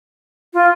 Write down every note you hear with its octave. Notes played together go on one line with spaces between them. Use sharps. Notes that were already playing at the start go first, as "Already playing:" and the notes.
F4